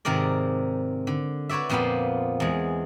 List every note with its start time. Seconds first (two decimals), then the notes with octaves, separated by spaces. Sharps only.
0.05 G#2 C3 D#3 A#4 D5
1.07 D3
1.49 F#4 B4 C#5 D5 E5
1.69 F2 A#2 B3 F4 C5 B5
2.40 E2 G#3